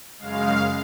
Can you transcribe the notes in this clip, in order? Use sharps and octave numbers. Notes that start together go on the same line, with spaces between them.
F#2 C#3 G#3 F5